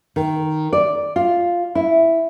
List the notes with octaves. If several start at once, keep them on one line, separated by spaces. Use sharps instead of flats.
D#3
D5
F4
E4